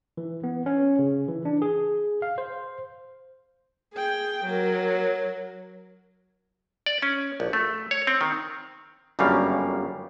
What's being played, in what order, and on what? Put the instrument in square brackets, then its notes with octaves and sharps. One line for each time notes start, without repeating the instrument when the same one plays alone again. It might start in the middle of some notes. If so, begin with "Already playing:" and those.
[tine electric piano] E3
B3
C#4
C#3
E3
D4
G#4
F5
C5
[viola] G#4 G5
F#3 A#4
[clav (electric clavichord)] D5
C#4
A#1
A3
C#5
C4
D#3
G1 F#2 C#3 G3 A#3 F5